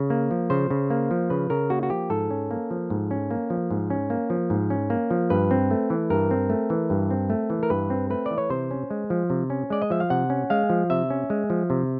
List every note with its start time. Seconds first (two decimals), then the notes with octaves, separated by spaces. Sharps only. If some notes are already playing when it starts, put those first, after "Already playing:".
Already playing: C#3
0.10 A#3
0.31 F3
0.50 C#3 C5
0.70 C#3
0.90 A#3
1.11 F3
1.30 C#3 B4
1.50 C#3 A#4
1.70 A#3 F#4
1.83 F#4
1.90 F3 G4
2.10 G#2 A4
2.31 C#4
2.51 A#3
2.71 F3
2.90 G#2
3.11 C#4
3.31 A#3
3.50 F3
3.71 G#2
3.90 C#4
4.10 A#3
4.30 F3
4.50 G#2
4.70 C#4
4.90 A#3
5.11 F3
5.30 G2 B4
5.51 C4
5.71 A3
5.90 E3
6.10 G2 A#4
6.31 C4
6.50 A3
6.70 E3
6.90 G2
7.11 C4
7.30 A3
7.50 E3
7.63 A#4
7.70 G2 B4
7.90 C4
8.10 A3 B4
8.26 E3 D5
8.38 C#5
8.50 C3 C5
8.71 C#4
8.91 G#3
9.10 F3
9.30 C3
9.50 C#4
9.70 G#3 D5
9.82 D#5
9.90 F3 E5
10.00 F5
10.10 C3 F#5
10.30 C#4
10.50 G#3 F5
10.70 F3
10.90 C3 E5
11.10 C#4
11.30 G#3
11.50 F3
11.70 C3